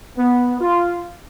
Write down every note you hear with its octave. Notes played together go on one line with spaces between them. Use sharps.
B3
F4